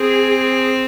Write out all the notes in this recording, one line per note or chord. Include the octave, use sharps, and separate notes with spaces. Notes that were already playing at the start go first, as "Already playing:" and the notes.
Already playing: C4 G#4